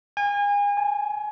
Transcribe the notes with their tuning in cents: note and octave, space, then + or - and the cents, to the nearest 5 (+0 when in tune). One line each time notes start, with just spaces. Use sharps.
G#5 -35
G#5 +25